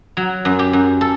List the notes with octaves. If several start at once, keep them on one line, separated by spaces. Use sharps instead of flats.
F#3
F#2
G4
F#2
A4